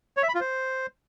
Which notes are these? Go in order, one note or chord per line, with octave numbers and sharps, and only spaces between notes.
C#5
E5
B5
F4
C5